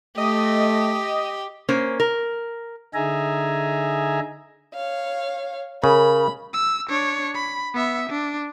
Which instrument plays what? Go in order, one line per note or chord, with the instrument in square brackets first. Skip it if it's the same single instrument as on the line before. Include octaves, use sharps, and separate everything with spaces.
[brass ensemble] A3 [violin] G4 [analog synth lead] D#5
[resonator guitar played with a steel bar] A#3 C#4 C5
A#4
[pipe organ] D3 D#4 G#4 E5 G#5 A#5
[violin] C#5 F5
[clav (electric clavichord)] C#3 [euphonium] A#4 [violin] B5
[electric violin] E6
D4 C#5
B5
B3 E5
D4